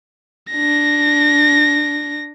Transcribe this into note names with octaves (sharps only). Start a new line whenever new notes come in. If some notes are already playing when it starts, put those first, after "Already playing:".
D4 A#6